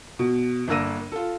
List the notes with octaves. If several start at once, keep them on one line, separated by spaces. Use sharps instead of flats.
B2
G1 A#3 D4 E6 A#6 D#7
F4 A4